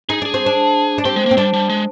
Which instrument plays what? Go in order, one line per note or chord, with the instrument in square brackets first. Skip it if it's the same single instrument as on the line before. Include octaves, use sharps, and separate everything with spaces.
[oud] D#4 [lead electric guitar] G#4
[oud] D4 [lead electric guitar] G#4
[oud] C4
D4
D4
[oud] C4 [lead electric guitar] G4
[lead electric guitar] G#3
A#3
[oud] C4
[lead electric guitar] G3 [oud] D4
[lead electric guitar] G3
G#3